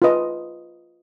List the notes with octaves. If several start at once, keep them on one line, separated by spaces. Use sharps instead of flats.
F4 B4 D#5